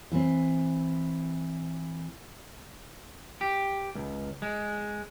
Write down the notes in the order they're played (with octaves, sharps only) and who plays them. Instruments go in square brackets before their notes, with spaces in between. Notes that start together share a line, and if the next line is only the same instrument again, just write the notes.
[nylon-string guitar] E3 C4
[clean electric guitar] G4
C#2
G#3